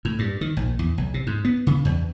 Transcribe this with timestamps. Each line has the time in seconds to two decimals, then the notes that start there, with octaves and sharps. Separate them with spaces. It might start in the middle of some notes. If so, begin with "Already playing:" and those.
0.05 A2
0.19 G2
0.41 D#3
0.57 A#1
0.79 E2
0.98 B1
1.14 C3
1.27 G#2
1.45 B3
1.67 C#3
1.85 E2